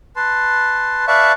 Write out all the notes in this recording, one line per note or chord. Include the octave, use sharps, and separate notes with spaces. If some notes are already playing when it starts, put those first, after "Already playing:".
B4 A5 C6
B4 D5 E5 F5 A5 C#6